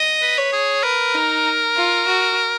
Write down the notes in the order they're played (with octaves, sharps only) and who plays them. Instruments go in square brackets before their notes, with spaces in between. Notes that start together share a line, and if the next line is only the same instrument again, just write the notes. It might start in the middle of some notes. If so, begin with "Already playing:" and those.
Already playing: [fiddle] D#5
[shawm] B4
[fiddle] C#5
[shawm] G#4
[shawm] A#4 [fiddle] B4
[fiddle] D#4
F4
F#4